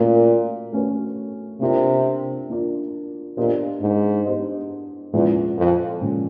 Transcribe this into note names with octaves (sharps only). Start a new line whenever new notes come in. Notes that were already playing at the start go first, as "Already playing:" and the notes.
Already playing: A#2 A3 C#4 F#4 B4
A3 C#4 F#4 B4
C3 A#3 D4 F4 A#4 D5
A#3 D4 F4 A#4 D5
A#2 B3 D4 G4 C5 D#5
G#2
B3 D4 G4 C5 D#5
E2 A#2 F3 G#3 C#4
F2
A#2 F3 G#3 C#4